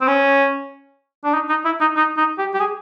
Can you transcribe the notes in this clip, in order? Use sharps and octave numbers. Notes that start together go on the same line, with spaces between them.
C4
C#4
D4
D#4
D#4
E4
D#4
D#4
D#4
G4
G4
G#4